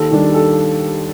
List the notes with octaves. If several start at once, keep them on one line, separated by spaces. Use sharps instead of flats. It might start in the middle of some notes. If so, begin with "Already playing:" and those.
Already playing: D#2 A4
D#3 G3 D4
A4